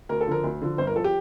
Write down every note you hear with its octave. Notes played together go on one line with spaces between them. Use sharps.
D2 A#4
A4
D3 F3 A#4
D2
D3 F3
G1 C5
A#4
F3 A4
G4